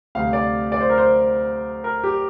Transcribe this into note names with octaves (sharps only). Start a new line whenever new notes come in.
D2 C3 G3 F5
D5
D5
C5
A#4
C5
A#4
G4